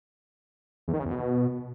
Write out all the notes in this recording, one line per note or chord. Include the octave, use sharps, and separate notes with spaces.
E2
D#3
C#3
E2
B2